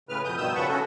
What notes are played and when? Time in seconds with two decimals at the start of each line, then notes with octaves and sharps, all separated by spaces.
0.09 A2 C#3 B4 F6
0.24 F2 B2 D#6 G6
0.37 G2 B2 D#3 D#6 E6 G6
0.55 C#3 F3 F#5 A5 B5 C#6
0.68 A3 C#4 F#4 A4